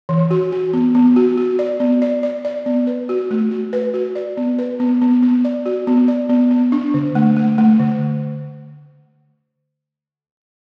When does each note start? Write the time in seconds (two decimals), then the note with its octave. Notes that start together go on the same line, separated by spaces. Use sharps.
0.09 E3
0.31 F#4
0.52 F#4
0.73 B3
0.95 B3
1.16 F#4
1.37 F#4
1.59 D5
1.80 B3
2.02 D5
2.23 D5
2.45 D5
2.66 B3
2.87 B4
3.09 F#4
3.31 A3
3.51 F#4
3.73 B4
3.94 F#4
4.15 D5
4.37 B3
4.59 B4
4.80 B3
5.01 B3
5.22 B3
5.45 D5
5.66 F#4
5.87 B3
6.08 D5
6.29 B3
6.51 B3
6.72 D4
6.94 D3
7.15 A3
7.37 A3
7.58 A3
7.79 D3